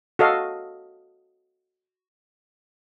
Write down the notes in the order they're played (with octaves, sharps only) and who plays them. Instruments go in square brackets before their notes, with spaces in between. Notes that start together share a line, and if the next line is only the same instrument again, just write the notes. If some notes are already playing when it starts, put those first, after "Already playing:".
[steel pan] F#4 A4 D#5 F5